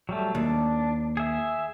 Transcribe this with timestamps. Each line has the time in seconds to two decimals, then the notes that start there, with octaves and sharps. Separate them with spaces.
0.09 F#3 G3 A3
0.35 D#2 D4
1.17 G#4 E5